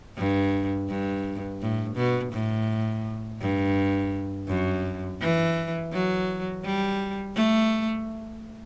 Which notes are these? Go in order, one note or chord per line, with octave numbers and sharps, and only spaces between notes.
G2
G2
A2
B2
A2
G2
F#2
E3
F#3
G3
A3